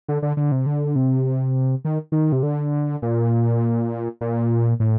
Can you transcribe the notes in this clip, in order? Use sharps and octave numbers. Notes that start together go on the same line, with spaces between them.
D3
D3
D3
C3
D3
C3
D#3
D#3
C3
D3
A#2
A#2
A2